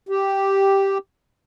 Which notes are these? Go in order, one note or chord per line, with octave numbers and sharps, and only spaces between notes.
G4